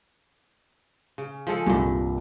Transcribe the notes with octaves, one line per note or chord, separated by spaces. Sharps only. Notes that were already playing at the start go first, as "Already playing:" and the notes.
C#3
F3 G#3 A4
C2 G2 A#2